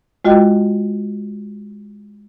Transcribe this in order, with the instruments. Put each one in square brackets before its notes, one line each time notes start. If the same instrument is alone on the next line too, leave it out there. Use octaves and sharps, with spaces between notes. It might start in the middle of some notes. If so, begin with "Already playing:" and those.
[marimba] G#3 F4 F#4 D#5 G5